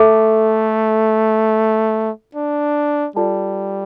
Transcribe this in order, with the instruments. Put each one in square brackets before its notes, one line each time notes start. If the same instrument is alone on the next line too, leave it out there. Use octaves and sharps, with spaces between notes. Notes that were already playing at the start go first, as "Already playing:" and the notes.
Already playing: [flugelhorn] A3 [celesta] A4 E5 A5 D6
[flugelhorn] D4
[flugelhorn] G3 [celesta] F4 A4 D5 A5